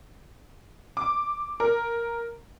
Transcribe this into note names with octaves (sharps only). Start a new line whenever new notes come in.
D6
A#4